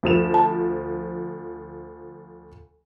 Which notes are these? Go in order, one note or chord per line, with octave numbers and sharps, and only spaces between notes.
D2 F3 E7
A5